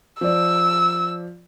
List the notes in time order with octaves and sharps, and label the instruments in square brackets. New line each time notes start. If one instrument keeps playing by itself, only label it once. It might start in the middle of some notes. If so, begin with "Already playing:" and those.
[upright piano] F3 D5 [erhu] E6